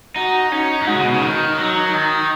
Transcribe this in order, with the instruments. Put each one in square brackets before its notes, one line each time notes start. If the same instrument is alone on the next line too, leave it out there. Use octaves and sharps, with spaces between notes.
[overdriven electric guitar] D#4 [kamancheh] F#4
[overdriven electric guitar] C#4 [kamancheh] D#4
[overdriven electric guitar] F#3
[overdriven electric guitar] G#3 [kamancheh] F#4
[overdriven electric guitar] C#3
B2
C#3
[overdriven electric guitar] D#3 [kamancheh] D#4
[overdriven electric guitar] F#3
D#3